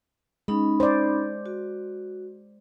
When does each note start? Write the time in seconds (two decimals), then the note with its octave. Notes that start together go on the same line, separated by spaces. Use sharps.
0.48 G#3 C#4 D#4 B5
0.80 C5 D5
1.46 F#4